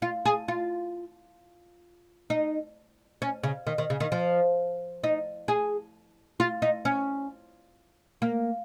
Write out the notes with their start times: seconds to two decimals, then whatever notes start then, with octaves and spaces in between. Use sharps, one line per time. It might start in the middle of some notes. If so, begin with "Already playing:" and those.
0.02 F4
0.25 G#4
0.48 F4
2.30 D#4
3.22 C#4
3.43 C#3
3.67 D#3
3.78 D#3
3.90 C#3
4.00 D#3
4.12 F3
5.04 D#4
5.48 G#4
6.40 F4
6.62 D#4
6.85 C#4
8.22 A#3